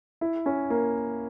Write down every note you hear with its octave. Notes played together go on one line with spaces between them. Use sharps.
E4
C#4
A#3